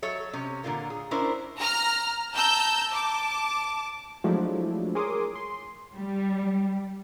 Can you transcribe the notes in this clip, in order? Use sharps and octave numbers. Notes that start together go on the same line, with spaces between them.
F#3 A4 C#5 E5
C3 C#4 C#5
A#2 D3 F3 F4 A#4
G#4
C#4 D4 E4 A#4 C5
A#5 F6
A5 A#5 E6 G6
A5 D6
F3 F#3 G#3 A3 D4 E4
G#4 A#4 C#5 C6 D6 D#6
C6
G3